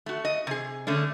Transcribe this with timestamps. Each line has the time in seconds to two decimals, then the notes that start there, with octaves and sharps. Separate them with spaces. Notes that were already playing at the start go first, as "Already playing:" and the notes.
0.06 A3 F#4
0.25 D#5
0.47 C3 G#4
0.87 D3 A3 C#4 D4